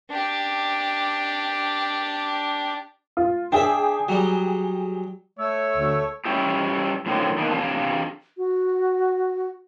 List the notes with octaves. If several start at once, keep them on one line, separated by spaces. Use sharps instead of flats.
D4 G4
F4
D4 G#4 E5 G5
F#3 G3
A3 C#5 E6
D2
G3 G#3 C#4 E4 G4
F#2 A2 D3 D#3 F3 F#3
D#3 A#3 B3 D4 D#4
C4 D4 G4 D5 F5 A5
F#4